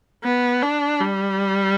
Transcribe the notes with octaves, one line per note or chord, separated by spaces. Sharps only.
B3
D4
G3